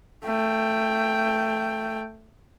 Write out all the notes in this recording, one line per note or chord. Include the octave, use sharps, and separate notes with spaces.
A3 G5